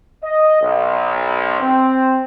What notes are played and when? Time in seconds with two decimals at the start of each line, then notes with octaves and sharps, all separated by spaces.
0.23 D#5
0.61 B1
1.60 C4